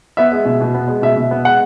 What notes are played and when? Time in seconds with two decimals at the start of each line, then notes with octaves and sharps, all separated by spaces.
0.17 B3 E5
0.32 G#3
0.45 B2
0.61 B2
0.74 B3
0.88 G#3
1.02 B2 E5
1.16 B2
1.31 B3
1.44 G#3 F#5